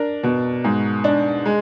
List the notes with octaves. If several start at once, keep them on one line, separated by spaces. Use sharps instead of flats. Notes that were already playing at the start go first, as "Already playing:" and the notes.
Already playing: D4 A#4
B2
G#2
D4
G#3